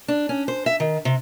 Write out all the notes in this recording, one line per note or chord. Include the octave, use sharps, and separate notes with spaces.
D4
C#4
C5
E5
D#3
C3